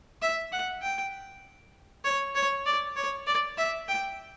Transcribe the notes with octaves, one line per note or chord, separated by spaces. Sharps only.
E5
F#5
G5
C#5
C#5
D5
C#5
D5
E5
G5